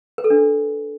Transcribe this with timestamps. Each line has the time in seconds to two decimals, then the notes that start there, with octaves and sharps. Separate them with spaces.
0.18 B4
0.24 A4
0.30 D4